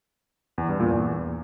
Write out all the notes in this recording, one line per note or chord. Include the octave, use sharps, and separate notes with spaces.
E2
G2
A#2
E2